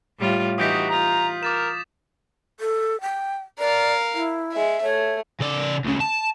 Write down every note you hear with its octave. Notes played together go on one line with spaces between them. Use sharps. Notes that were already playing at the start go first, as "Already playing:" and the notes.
A2 G3 F4
E3 D#4 F#4 G4 D#6 G6 B6
F4 A#5
A#4 D6 A6 E7
A4
G5
A#4 D5 F5
E4
G#3 E5
A3 C#5
C#3 D5
D2 C#3
A5